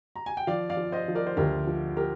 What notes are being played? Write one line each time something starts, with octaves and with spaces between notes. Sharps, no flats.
A#5
G#5
G5
F3 D5 F5
D5 F5
F3
C5 D#5
F3
A#4 D5
C5
D2 G4 A#4
F3
G4 A#4